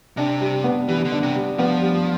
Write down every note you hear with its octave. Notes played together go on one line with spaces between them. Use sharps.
C3 D4
G3
B3
E3 G3
D3
D4
C3
G3
F3 B3
G3